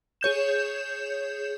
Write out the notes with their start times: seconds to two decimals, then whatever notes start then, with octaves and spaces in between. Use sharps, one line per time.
0.21 G#4 C#5 G6 E7